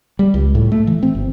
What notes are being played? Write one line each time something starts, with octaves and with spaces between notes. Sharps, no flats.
G3
C#2
A2
A3
E3
C4
G1